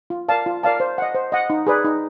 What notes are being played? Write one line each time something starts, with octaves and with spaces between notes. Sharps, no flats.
F4
A#4 D5 F5 A5
F4
A#4 D5 F5 A5
C5
D#5 F#5
C5
D#5 F#5
D#4
G#4 B4 D5
D#4